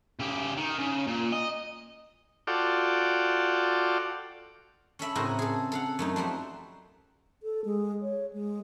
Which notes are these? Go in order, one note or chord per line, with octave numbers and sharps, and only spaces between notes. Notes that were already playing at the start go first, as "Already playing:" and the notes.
C#3 G4
D#3
C#3
A#2
D#5
F4 F#4 A4 D5 G5
C#4 A4 E5 B5
A2 C#3 C4 F#4 A#4 D#5
G#4 A4
A4 F5 F#5
F#2 A3 D#4
F3 G3 F#4 E5
A4
G#3
C#5
G#3